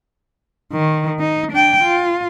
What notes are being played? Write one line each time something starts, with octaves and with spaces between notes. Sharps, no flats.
D#3
D#4
D4 G5
F4